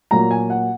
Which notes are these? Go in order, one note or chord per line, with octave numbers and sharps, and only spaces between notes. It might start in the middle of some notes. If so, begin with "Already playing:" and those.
A#2 F#3 A#3 A#5
G#5
F#5